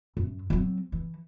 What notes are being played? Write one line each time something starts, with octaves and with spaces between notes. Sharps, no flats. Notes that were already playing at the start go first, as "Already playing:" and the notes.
F#2
F#3 C4
E3